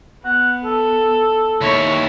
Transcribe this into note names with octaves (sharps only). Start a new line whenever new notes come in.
B3 F#5
A4
D#2 E4 C#5